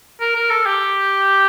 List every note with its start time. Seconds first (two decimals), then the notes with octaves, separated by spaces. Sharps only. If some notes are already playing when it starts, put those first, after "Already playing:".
0.21 A#4
0.36 A#4
0.51 A4
0.66 G4